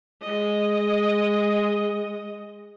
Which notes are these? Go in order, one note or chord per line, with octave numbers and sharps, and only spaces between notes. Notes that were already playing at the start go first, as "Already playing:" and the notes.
G#3 D#5